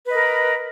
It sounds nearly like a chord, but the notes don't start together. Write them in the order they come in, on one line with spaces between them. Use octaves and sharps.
B4 D#5 A#4 B5